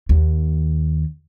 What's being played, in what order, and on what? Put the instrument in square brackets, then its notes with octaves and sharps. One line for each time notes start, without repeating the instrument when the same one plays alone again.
[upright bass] D#2